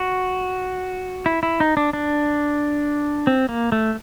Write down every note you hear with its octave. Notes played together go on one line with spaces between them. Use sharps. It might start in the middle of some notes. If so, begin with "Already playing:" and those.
Already playing: F#4
E4
E4
D#4
D4
D4
C4
A#3
A3